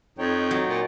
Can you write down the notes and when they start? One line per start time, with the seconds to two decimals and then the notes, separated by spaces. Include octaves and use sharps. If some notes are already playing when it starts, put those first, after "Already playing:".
0.18 F2 D#4 C#5 G5
0.51 F#3
0.69 A#2